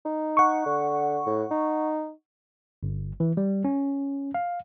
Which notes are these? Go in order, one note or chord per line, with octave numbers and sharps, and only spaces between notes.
D#4
F#5 C#6
D3
A2
D#4
G1
E3
G3
C#4
F5